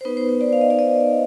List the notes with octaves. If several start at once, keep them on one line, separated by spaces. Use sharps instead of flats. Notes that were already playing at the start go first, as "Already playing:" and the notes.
C5
B3 D#4 B4
C5
C5
D5
F5
D#5
D5
D#5